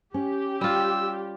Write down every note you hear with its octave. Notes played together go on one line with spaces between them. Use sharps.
C#4 G4
G3 F4 E6